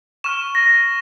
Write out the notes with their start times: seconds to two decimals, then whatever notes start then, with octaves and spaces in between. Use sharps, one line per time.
0.24 C#6 F6 E7
0.55 A#6